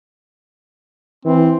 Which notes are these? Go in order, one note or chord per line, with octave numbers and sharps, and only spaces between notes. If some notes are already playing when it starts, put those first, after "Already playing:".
E3 C4